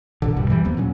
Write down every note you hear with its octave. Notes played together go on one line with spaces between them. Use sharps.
E2 A#2 D3
D2 G2 B2 G3
E2 E3 G3
D#2 F3 A#3 B3
A#2 F#3 C#4